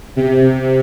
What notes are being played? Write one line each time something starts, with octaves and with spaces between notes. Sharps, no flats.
C3